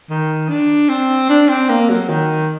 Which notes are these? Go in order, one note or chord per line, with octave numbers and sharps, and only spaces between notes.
D#3
D4
C4
D4
C4
A#3
F#3
D#3